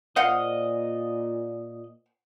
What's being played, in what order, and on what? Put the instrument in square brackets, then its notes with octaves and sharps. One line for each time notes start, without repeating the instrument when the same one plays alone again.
[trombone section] A#2 [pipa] C5 F5 F#5 [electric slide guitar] D#5